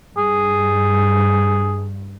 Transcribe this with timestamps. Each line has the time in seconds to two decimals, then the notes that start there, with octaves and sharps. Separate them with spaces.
0.18 G2 G#4